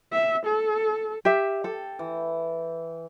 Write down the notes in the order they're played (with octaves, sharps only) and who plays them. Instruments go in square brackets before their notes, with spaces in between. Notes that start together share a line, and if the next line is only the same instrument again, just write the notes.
[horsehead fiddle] E5
A4
[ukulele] G4 E5
[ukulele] A4 [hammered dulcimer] G5
[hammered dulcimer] E3